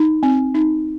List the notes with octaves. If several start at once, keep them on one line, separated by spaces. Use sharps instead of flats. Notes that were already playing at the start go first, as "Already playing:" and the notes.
Already playing: D#4
C4
D#4